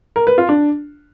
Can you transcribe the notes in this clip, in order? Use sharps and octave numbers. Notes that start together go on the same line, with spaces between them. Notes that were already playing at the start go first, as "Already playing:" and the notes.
A#4
B4
F4
D4